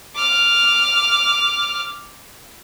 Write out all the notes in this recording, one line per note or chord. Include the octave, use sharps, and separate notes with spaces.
D6 F6